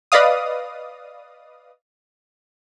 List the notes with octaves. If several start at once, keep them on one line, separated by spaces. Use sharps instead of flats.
B4 D5 D#5 F5 D#6